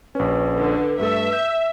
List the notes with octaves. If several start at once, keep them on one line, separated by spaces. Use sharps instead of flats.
A#1 C#4 B4
D3
G2 A3 A4 E5
G6